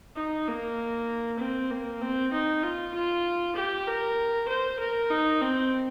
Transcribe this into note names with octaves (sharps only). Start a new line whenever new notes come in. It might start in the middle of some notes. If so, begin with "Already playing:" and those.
D#4
A#3
C4
A#3
C4
D#4
F4
F4
G4
A#4
C5
A#4
D#4
C4